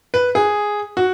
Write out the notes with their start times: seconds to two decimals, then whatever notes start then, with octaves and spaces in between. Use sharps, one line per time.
0.14 B4
0.35 G#4
0.97 F#4